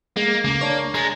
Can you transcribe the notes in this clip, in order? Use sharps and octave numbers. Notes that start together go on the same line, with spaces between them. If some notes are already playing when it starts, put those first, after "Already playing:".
G#3 A#3
C#2 A#3
D4 C#5
G#3 A#5 G#6 A6